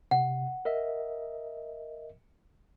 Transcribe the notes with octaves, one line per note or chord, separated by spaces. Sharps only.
C3 F#5
A#4 D#5 E5